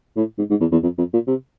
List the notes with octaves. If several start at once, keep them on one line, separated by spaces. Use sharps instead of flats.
A2
G#2
G#2
E2
E2
F2
F2
A#2
C3